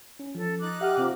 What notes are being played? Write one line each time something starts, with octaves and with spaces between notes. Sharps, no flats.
C#4
F3 A4
D#4 D6 F#6
G4 E5 F#5 F6
C3 C4 F4